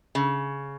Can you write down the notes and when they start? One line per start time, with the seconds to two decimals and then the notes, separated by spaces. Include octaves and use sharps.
0.15 C#3